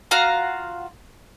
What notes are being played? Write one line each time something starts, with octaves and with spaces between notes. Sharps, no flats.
F4 F#4 F5 A#5